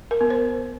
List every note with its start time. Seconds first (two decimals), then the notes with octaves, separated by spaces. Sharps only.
0.11 A#4
0.21 B3
0.30 C5